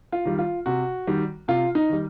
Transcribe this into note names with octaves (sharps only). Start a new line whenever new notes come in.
F4
D#3 G3
F4
C3 F#4
D#3 G3
C3 F4
D#4
D#3 G3